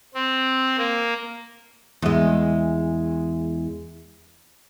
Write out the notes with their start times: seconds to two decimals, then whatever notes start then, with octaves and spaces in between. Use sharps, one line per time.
0.14 C4
0.78 A#3
2.02 E2 G#3